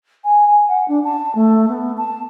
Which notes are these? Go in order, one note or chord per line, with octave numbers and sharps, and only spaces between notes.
G#5
G#5
F#5
D4
A5
A3
B3
A5